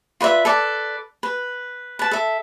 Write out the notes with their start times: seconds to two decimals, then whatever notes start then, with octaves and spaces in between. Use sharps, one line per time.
0.21 F4 B4 D5 E5
0.45 A4 B4 D5
1.23 B4
1.99 B4 A5
2.11 A4 E5